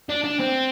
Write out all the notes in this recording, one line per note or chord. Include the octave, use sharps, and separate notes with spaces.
D4
D4
C4